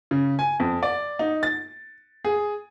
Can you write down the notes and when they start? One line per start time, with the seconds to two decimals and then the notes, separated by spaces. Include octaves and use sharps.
0.11 C#3
0.39 G#5
0.60 F2
0.83 D5
1.19 D#4
1.43 A6
2.25 G#4